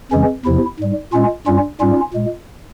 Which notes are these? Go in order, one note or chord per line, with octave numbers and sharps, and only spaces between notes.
F2 C#3 E3 G#3 C#4
E2 C3 F3 E4
G#2 G3
A#2 G#3 C#4 F4
G2 G3 C#4 F4
G#2 G3 C#4 F4
A#2 G#3